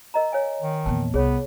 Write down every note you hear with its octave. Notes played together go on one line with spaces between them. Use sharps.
A#4 D#5 A#5
C#5 F5 G#5
D#3
E2 A#2 A5
C2 B3 G#4 C#5